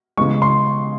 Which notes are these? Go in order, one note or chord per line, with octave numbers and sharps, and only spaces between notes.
C#3 E3 G#3 C#6
C6